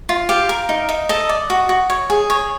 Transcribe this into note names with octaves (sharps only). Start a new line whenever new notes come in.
F4
G4 F5
A#4
D#4
D#4
A4 D#5
D5
F#4
F#4
C#5
G#4
C#5